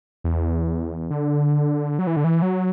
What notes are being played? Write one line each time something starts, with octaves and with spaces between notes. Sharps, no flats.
E2
D3
F#3
E3
D3
E3
F#3